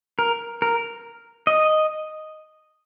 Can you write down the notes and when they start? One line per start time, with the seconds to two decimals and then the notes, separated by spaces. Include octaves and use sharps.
0.19 A#4
0.62 A#4
1.47 D#5